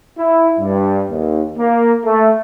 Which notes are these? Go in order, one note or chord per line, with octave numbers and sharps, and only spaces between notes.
E4
G2
D#2
A#3
A3